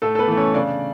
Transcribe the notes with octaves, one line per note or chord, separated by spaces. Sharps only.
A2 A3 A4
A4
B3 B4
E3 A3
C#4 C#5
C#3 D4 D5